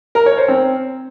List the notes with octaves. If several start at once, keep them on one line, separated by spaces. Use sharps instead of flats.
A#4
C#5
C5
C4